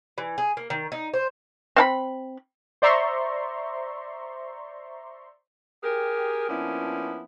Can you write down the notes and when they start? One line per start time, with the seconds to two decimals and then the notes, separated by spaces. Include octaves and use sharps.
0.18 E3
0.38 G#4
0.57 A#3
0.70 D#3
0.92 D#4
1.14 C5
1.76 C4 F5 B5
2.82 C5 D5 E5 A#5 C6 C#6
5.83 G4 G#4 A#4
6.50 F3 A#3 B3 C#4 D4 E4